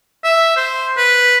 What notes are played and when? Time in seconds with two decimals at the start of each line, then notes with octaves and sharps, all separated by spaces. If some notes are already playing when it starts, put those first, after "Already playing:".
0.24 E5
0.56 C5
0.97 B4